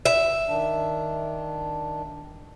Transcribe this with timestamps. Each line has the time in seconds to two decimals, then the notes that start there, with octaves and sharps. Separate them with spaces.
0.06 E5
0.48 D#3 D4